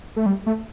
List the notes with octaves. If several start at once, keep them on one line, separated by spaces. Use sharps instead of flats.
A3
G3
A3